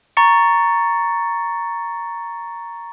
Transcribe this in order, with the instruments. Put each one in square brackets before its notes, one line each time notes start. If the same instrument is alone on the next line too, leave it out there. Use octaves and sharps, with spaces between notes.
[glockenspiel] A#5 C#6 A6 C#7